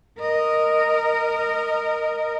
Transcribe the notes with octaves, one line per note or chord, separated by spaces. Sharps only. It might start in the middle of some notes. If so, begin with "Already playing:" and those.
A#4 D#5